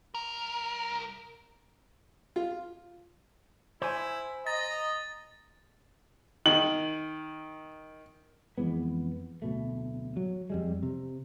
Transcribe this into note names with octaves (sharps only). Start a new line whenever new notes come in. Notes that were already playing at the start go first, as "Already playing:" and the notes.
C2 A#4
F4
E4 C5 G#5
D#5 A#5 A6
D#3 F#7
F2 E3 G#3 B3
D1 B2 A3
F#3
F2 G3 G#3
C3